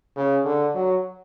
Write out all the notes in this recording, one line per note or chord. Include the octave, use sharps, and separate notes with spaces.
C#3
D3
F#3